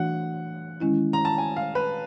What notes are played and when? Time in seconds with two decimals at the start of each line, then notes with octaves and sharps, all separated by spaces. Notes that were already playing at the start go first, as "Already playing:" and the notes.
Already playing: E3 A3 D4 F#4 F#5
0.80 D#3 G#3 C#4 E4
1.13 A#5
1.25 A5
1.38 G#5
1.56 F5
1.75 B4